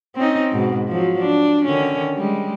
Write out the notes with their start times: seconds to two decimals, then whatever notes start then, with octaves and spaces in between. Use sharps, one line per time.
0.16 C4 C#4 D#4
0.52 G#2 B2
0.87 F3 F#3
1.19 D4
1.65 D3 D#3 C#4
2.17 G3 G#3